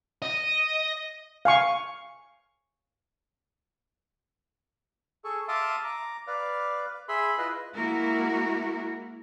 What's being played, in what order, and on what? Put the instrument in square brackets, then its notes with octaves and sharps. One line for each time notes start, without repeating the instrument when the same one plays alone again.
[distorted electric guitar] D#5
[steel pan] F5 G#5 C#6
[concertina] G#4 A4 C#6
E5 F5 A5 C6 D6 D#6
A#5 D6
B4 D5 F5
G#4 E5 B5 C6
E4 F4 B4 D#5
[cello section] G#3 A#3 E4 F#4 A#4